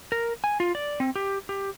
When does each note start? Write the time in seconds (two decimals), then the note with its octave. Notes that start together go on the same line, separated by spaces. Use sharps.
0.12 A#4
0.44 G#5
0.60 F4
0.75 D5
1.00 C4
1.16 G4
1.49 G4